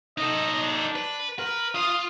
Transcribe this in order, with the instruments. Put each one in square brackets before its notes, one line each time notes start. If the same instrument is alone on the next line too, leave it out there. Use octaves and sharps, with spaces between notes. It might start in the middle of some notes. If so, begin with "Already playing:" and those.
[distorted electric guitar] D#4 A4 [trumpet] D#5
[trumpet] D4
[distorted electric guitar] B4
[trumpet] A#4 [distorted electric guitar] B4
[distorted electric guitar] F4 F5 [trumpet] D#6